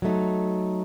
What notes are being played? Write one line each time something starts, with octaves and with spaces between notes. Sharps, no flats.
F#3 A3 D#4